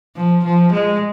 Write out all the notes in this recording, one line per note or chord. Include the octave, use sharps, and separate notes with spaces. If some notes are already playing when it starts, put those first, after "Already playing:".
F3
F3
G#3